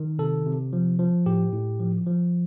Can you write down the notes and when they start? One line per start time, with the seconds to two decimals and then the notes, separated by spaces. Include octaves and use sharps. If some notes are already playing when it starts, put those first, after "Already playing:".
Already playing: D#3
0.19 C3 A4
0.46 C3
0.73 F3
0.99 F3
1.26 A2 G4
1.53 A2
1.80 F3
2.07 F3